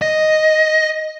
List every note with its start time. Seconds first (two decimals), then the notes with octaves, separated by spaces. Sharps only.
0.02 D#5